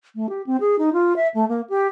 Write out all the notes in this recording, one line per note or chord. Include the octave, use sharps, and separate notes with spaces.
A3
G4
C4
G#4
D#4
F4
E5
A3
A#3
G4